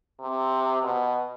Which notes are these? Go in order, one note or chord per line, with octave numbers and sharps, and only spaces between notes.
C3
B2